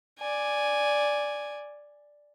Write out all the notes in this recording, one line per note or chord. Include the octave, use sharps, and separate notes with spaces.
D5 G#5